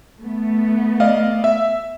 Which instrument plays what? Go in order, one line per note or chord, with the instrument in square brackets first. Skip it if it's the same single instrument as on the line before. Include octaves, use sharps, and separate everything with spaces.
[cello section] A3 B3
[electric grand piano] D5 D#5 F5
E5